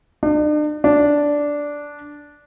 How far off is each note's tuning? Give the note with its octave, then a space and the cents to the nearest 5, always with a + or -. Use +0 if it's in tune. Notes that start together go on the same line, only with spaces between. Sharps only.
D4 +45
D4 -5